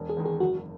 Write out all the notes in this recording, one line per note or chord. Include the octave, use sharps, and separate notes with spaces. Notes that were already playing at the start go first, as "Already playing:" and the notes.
Already playing: E1
G#4
E2 D#3 G#3
G#4
F#1 F#4